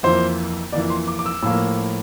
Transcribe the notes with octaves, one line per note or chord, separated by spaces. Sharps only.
F2 E3 A#3 C5
F2 E3 A#3 D5
C6
D6
D6
E6
A2 F3 A#3 E6